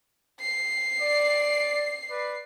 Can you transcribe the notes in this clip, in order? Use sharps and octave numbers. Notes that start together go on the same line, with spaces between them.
C7
D5
B4 D5